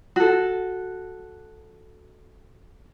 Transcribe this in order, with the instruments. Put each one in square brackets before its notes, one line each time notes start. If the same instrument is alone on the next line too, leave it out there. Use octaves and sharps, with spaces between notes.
[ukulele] F#4 A4